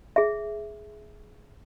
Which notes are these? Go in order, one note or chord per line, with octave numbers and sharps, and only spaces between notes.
G#4 E5